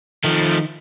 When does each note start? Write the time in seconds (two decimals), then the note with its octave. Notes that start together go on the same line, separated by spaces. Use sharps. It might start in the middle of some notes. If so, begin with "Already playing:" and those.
0.24 D#3 F3 A3